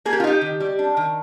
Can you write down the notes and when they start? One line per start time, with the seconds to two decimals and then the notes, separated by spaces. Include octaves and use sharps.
0.05 A#3 G#4
0.13 G4
0.20 F4
0.24 D#4 G4
0.41 D#3
0.60 G3
0.79 D4
0.97 D#3